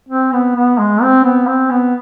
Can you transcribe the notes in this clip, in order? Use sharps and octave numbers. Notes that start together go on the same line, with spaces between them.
C4
B3
B3
G#3
C4
B3
C4
B3